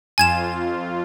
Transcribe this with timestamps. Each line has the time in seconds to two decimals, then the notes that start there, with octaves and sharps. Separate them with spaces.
0.18 F2 F4 G#5 G#6 E7